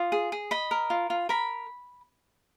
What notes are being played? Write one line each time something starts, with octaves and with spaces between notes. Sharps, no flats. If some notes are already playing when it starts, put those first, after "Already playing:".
Already playing: F4 D#6
G#4
G#4
D#5 B5
A#4
F4
F4
A#4 B5